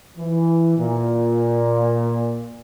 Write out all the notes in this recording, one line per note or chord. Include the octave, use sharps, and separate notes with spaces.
E3
A#2